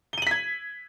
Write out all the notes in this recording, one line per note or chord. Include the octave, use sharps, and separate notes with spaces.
G#6 B6 D#7 F#7 G7